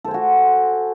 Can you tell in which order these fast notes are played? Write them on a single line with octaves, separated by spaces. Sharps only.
A4 C5 G#5 F#4